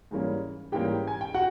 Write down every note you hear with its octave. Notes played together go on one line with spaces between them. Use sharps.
G#2 E3 G3 A#3 C#4
G#2 E3 G3 A#3 C#4 G4 G5
G#5
G5
F#4 F#5